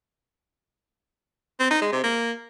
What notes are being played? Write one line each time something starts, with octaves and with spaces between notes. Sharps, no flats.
C4
D#4
G#3
C3
A#3